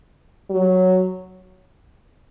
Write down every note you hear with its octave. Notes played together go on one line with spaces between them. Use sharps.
F#3